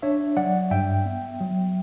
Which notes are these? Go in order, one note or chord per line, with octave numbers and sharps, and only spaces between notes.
D4 C#5 E5
F#3 D5 F#5
G2 E5 G5
B3
F#3